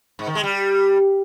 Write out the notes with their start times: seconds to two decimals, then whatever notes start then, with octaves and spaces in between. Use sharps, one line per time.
0.19 G#2
0.27 D#3
0.35 G#3
0.43 G3